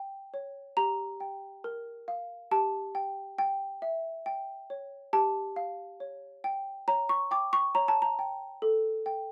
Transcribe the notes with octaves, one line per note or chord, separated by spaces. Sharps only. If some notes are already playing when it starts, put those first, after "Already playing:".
Already playing: G5
C#5
G4 A#5
G5
A#4
F5
G4 A5
G5
G5
E5
G5
C#5
G4 A5
F5
C#5
G5
C#5 A#5
C#6
G5 D6
C#6
C#5 A#5
A5
A#5
G5
A4
G5